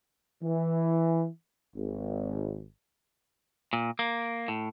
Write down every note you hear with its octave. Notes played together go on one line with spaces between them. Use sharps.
E3
G#1
A#2
A#3
A2